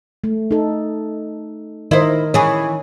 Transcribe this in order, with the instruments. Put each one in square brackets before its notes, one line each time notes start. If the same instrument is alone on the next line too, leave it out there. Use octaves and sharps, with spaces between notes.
[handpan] A3
D#4 A4
[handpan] D#3 A#4 D#5 [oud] E4 C5
[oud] E3 G#4 [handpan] C#5